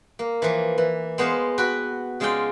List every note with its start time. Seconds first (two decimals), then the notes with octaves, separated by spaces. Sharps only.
0.19 A#3
0.42 E3 F3
0.78 E3
1.18 G#3 B3 C5 C#5 F5
1.58 F#4 B4 G5
2.20 C#3 G#3 F4 C#5 D5 G5